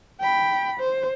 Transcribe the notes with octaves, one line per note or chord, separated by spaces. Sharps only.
G5 B5
C5